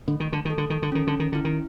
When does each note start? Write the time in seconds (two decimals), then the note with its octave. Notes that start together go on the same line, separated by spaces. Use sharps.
0.08 D3 A3
0.20 D#3
0.33 D3
0.45 D#3 A4
0.58 D3
0.70 D#3
0.82 D3
0.92 D#3 C#4
1.07 D3
1.20 D#3
1.32 D3 E4
1.45 D#3